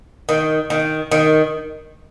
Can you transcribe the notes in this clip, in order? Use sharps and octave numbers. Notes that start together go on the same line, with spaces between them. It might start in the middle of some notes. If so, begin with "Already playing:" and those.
D#3
D#3
D#3